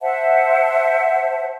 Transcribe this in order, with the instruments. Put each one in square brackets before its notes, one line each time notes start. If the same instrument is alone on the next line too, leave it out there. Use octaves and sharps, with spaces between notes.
[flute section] C5 E5 F#5 A5